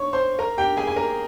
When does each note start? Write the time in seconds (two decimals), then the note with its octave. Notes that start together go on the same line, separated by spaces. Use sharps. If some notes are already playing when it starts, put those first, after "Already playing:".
Already playing: C#5 C#6
0.13 C5 C6
0.39 A#4 A#5
0.58 G4 G5
0.77 G#4 G#5
0.87 G#5
0.96 A#4 A#5